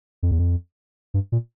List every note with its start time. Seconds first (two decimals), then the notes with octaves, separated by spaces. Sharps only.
0.23 F2
0.31 E2
0.39 F2
1.14 G2
1.32 A#2